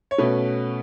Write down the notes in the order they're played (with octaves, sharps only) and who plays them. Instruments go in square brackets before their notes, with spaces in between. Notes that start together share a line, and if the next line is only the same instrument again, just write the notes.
[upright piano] C#5
B2 A3 C#4 B4